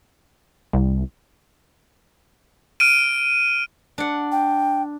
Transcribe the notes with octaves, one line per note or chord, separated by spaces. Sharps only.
C2
F6 D7 D#7
D4 F#5
G5